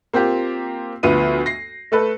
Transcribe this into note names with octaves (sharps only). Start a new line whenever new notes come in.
A#3 C4 F4 G4
D2 F3 B3 D#7
A#6 C7
A3 A4 B4